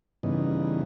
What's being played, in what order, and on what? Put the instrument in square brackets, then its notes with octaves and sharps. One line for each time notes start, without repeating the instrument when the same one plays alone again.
[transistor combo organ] G2 C#3 E3 B3 D#4